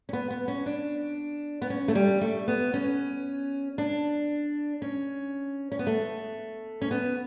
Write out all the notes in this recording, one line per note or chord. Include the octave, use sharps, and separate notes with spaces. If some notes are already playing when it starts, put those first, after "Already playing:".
C#4
B3
B3
C#4
D4
B3
C#4
A3
G3
A3
B3
C#4
D4
C#4
C#4
B3
A3
C#4
B3